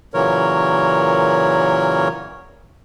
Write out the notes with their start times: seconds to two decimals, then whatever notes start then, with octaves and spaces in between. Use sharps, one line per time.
0.14 A#2 C#3 E3 F#3 A#4 C#5